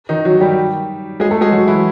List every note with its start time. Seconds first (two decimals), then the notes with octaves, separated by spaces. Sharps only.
0.09 D#3 D#4
0.25 F#3 F#4
0.41 G3 G4
1.20 G#3 G#4
1.31 A3 A4
1.41 G#3 G#4
1.52 F#3 F#4
1.68 E3 E4